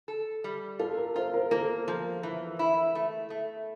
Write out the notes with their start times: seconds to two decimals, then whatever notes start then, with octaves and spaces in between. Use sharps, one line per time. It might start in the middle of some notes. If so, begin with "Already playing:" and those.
0.08 A4
0.44 G3
0.79 F4 A4
0.97 A#4
1.15 F4 C5
1.34 A#4
1.51 A#3 A4
1.88 F3
2.23 E3
2.59 E4
2.95 A3
3.30 A3